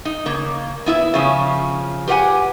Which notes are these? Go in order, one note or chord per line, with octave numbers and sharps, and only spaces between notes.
D#4
C#3 A#3
B3 E4 E5
C#3 F3 C#4
G4 B4 C5 F5 F#5 G#5